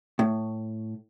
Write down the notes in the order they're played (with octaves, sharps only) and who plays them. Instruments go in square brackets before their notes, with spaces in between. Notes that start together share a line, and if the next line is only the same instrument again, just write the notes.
[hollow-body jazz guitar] A2